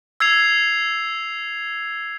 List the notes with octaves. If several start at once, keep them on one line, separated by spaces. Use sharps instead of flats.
E6 G#6 C7 F7